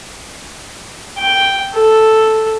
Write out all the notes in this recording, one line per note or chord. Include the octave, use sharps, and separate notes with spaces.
G5
A4